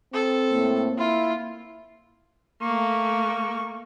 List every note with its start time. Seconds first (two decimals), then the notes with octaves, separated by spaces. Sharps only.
0.14 C4 A4
0.52 A2 A#3
0.98 E4 F4
2.62 A3 A#3 C#6